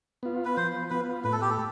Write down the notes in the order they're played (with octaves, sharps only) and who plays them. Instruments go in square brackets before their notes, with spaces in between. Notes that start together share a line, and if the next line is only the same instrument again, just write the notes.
[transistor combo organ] B3 F4
[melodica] B4
[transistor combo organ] F3 [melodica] C5
[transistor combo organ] B3 F4 [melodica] B4
[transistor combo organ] A2 [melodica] B4
[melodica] A4
G4
A4